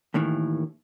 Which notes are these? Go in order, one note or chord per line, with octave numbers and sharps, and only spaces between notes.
D#2 A2 D#3 E3